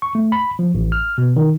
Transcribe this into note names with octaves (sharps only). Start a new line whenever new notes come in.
C#6
A3
B5
F3
A1
F6
B2
D#3